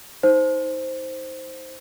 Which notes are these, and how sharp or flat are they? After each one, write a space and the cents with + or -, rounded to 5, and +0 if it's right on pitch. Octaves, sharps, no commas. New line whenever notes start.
D#4 +25 C5 +0